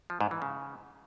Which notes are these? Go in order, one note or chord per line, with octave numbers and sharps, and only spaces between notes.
F3
G#2
E3
C#3